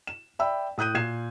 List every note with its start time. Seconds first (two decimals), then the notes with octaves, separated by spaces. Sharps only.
0.07 E7
0.39 D5 E5 G5 B5 E6
0.78 A2 D#6 F#6 G6 D#7
0.95 A#2 G#6 C7 E7